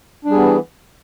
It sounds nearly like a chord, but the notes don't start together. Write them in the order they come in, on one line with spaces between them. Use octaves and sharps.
D4 G3 G#4 B3 E3